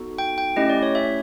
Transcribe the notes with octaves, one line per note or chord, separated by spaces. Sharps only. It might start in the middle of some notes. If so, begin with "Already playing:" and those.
Already playing: B3 D#4 F#4 A4
G5
G5
A3 C#4 E4 G4 D#5
D5
C#5
E5